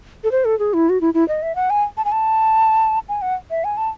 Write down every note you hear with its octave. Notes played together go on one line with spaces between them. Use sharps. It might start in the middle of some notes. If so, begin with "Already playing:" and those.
A4
C5
A4
G#4
E4
F#4
E4
E4
D#5
E5
F#5
G#5
A5
G#5
A5
G#5
F#5
E5
G#5
A5